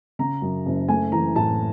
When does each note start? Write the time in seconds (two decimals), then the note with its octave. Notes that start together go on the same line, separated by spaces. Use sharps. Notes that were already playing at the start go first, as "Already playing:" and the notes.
0.19 C#3 A#5
0.42 F#2
0.66 F#1
0.89 A3 G#5
1.12 E3 A#5
1.36 A2 A5